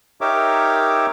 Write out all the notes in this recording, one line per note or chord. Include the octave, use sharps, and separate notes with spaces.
D#4 G4 A#4 C#5 E5 D6